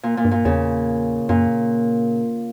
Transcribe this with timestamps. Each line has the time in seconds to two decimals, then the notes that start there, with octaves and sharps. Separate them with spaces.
0.03 A#2
0.17 A#2
0.25 G2
0.31 A#2
0.45 E2 C#3
1.29 F#2 A#2